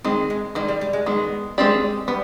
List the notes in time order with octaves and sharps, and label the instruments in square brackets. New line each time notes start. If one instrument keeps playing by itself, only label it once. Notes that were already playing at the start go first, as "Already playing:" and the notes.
[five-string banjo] D#3 G#3 [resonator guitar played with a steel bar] C4
[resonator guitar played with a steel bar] G#3
[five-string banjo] D#3 G#3 [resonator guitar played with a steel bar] G3
[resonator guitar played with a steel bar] G3
G3
G#3
[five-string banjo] D#3 G#3 [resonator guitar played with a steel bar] B3
[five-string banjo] D#3 G#3 C4 G4 D5
[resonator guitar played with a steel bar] G3 [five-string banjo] B3